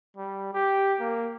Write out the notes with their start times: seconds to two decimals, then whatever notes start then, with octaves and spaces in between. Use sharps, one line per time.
0.17 G3
0.53 G4
1.00 A#3